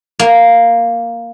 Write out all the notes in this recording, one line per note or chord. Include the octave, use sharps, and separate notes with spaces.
A#3